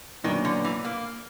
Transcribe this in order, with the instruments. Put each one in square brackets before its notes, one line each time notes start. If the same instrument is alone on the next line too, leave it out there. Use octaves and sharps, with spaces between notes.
[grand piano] A#2 F#3 B3 D4 [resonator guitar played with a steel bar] D#3
[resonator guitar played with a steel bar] D3
E3
A#3